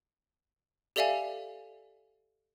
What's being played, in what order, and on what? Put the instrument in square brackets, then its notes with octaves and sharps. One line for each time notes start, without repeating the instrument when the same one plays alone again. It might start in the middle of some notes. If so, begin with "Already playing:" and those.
[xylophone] G4 A4 D5 E5 F5 G#5